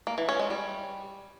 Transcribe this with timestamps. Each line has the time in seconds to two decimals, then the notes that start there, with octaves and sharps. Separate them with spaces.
0.07 A#3
0.18 E3
0.29 C#4
0.39 G#3
0.50 G3